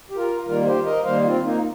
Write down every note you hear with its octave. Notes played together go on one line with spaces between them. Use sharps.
G4
F4 A#4
D#3 G3 A#3 F4 A#4
G4 C5
A#4 D#5
D#3 G3 A#3 C5 F5
C4 F4
A#3 D#4